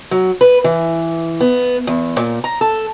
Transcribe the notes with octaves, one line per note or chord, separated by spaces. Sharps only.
F#3
B4
E3
B3
E2
A#2
A#5
A4